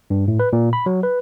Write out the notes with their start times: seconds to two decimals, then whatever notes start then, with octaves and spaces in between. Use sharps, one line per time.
0.10 G2
0.28 A2
0.40 B4
0.53 A#2
0.73 B5
0.86 F#3
1.03 B4